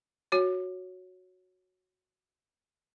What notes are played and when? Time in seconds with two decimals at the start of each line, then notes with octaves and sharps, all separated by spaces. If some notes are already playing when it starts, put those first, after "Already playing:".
0.32 F#4 C#5